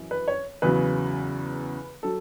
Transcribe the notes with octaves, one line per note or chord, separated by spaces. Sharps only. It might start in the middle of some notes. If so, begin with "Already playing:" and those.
Already playing: F#2 E3
B4
C#5
E2 C#3 F#3 B4
F#3 A4